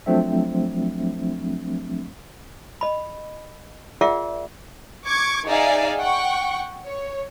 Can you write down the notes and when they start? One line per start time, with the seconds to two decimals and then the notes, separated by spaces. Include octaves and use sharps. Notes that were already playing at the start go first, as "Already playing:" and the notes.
0.06 F3 F#3 A3 C4 D4 E5
2.81 D#5 B5
4.01 F4 G#4 A#4 D5 E5 F#5
5.05 C#6 D6 G#6
5.46 D#4 G#4 D5 E5 F5 G#5
5.99 F#5 G5 C#6
6.86 C#5